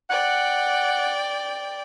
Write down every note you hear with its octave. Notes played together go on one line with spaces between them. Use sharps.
D5 F#5 G5